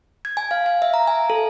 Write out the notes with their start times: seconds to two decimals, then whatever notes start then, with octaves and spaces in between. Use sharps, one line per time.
0.25 G#6
0.37 G#5
0.51 F5
0.66 F5
0.82 E5
0.94 A#5
1.07 G#5
1.30 A4